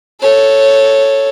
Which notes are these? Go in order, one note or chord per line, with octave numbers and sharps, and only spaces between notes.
A4 C#5